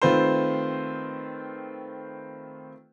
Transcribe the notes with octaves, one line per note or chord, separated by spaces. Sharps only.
D#3 A3 C4 F4 B4 C5